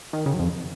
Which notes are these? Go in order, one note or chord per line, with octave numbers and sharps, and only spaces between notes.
D#3
C#3
F#2
F2